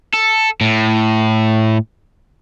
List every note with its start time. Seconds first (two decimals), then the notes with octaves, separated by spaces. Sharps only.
0.13 A4
0.61 A2